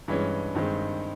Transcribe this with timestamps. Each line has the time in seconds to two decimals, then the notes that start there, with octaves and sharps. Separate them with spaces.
0.08 G2 E3 G#3 C#4
0.55 G2 D#3 G#3 C4